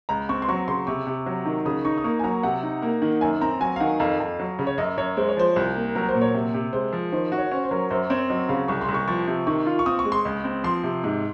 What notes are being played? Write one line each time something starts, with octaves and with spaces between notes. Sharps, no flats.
C#2 A#5
C4 C#6
C6
F#3 C#6
C#3 C6
C3 C#6
C3
F#3
D#3
C#3 D#6
D#4 C#6
D#6
A#3 C#6
G#5
F#3 A#5
C3 F#5
D#4
A#3
D#3
F#2 G#5
C4 A#5
F#3 G#5
F5
D#3 F#5
F2 F5
F2
F#3
C#3
C#5
F#2 D#5
F#2 C#5
G#3 C5
C#5
F3 C5
C2
A#3
F#3 A#4
C5
A#2
C#5
C3
C3
G#3 C5
F3
D#3 C5
F#4
C#5
C#4 C5
C5
F#3 A#4
F#2 C5
C4 C#5
F#3 D#5
C#3 F5
C2 C#6
C6
C2
C#6
F3 C#6
C3
D#3 C#6
F4
C#6
C4 D#6
C#6
G#3
C6
C#2
C4
F3 C6
C3
G#2